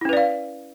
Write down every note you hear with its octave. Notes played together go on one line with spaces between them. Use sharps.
C#4 E4 B4 D5 F5